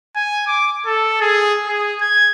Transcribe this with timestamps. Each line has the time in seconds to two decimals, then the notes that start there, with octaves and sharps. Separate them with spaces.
0.16 G#5
0.47 D6
0.86 A4
1.21 G#4
1.67 G#4
2.01 G#6